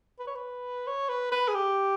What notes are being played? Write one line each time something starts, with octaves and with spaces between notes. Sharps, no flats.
B4
C#5
B4
C#5
B4
B4
G#4
G4